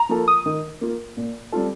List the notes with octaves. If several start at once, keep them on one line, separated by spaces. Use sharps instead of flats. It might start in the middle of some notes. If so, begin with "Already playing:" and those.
Already playing: A#5
F3 A#3 F4 A4
D#6
D#3
A#3 F4
A#2
G3 C4 F4 A4